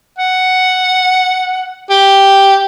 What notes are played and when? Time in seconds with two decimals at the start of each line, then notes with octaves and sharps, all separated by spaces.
0.18 F#5
1.90 G4